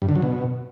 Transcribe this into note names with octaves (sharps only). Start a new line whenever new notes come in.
G2
D3
F#3
B2